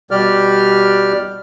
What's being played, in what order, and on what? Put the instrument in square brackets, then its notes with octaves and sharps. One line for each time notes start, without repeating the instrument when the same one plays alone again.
[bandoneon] B2 G3 G4 D5 F6